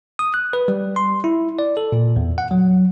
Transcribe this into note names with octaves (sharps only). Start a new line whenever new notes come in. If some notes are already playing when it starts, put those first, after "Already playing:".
D#6
F#6
B4
G3
C6
E4
D5
A4
A#2
E2
F#5
F#3